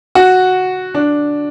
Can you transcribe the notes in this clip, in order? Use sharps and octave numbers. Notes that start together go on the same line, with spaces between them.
F#4
D4